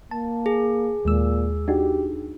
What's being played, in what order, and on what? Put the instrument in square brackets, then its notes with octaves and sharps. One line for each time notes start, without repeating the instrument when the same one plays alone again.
[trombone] A#3 [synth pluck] A5
[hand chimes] G#4
[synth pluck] D#2 G#3 E6 [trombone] A#2
[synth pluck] D4 D#4 F#4 [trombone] G4